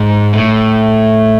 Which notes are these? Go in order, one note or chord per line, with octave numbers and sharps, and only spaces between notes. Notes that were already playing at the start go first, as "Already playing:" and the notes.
Already playing: G#2
A2